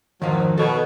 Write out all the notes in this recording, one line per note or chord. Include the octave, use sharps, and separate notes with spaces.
F2 G#2 D#3 F3 F#3
B2 A4 C#5